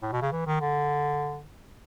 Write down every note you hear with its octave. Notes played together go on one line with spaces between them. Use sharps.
A2
B2
C#3
E3
D#3
D3